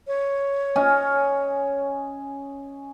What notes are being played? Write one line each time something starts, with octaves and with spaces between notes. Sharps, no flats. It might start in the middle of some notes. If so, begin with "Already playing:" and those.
C#5
C#4 D#5 G#5